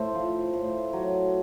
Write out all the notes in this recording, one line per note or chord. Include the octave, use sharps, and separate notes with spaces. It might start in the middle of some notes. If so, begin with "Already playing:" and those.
Already playing: A2 A4 C5
F3
A2
F#3